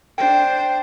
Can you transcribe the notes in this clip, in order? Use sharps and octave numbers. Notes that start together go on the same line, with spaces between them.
D4 C5 G5